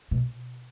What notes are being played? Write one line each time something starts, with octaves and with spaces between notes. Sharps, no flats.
B2